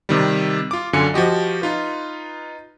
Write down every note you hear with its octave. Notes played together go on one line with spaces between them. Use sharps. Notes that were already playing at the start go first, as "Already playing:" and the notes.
C3 D#3 G3
F4 D6
F#2 D3 F4 G#5 C#7
F3 F#4 G4 D#5
D#4 F4 B4